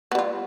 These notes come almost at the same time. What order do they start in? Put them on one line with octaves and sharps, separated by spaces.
B3 G3 F4